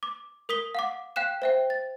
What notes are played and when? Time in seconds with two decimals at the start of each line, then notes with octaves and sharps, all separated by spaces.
0.03 D6
0.49 A#4 D#6 B6 G7
0.75 F5 F#5 D6
1.16 F5 G5 F#6 E7
1.42 C5 E5 G5
1.70 A6